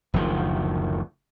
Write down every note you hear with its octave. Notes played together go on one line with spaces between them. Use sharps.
F#1 D2 D#3 F3